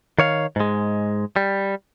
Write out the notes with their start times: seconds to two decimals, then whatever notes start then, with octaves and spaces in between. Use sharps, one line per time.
0.18 D#3 C#5 F5
0.56 G#2 G#3
1.36 G3